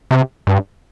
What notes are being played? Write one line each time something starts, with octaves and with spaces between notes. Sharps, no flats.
C3
G2